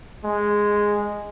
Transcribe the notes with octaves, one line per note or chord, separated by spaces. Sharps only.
G#3